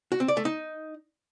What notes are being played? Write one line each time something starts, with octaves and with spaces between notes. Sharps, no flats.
F#4
C4
D5
A3
D#4